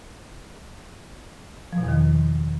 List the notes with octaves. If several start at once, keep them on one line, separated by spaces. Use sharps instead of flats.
F3
B2
E2
D#3